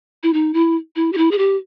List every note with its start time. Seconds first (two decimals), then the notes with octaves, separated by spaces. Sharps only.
0.23 E4
0.33 D#4
0.54 E4
0.96 E4
1.12 G4
1.17 E4
1.31 G#4
1.38 G4